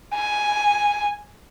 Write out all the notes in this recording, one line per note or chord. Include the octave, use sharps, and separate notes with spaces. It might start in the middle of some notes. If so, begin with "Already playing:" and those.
G#5